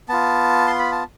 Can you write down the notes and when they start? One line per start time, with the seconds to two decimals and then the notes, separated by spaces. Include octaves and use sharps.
0.09 B3 F4 A5
0.67 C6
0.79 B5
0.92 A5